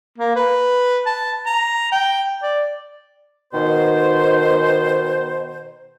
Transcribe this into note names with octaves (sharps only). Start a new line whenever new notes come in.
A#3
B4
A5
A#5
G5
D5
B2 D#3 C5